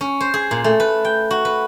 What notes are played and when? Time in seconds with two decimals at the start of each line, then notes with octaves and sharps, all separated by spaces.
0.01 C#4
0.20 C5
0.34 G#4
0.51 A#2
0.64 A3
0.80 B4
1.05 G5
1.31 F#4
1.45 B4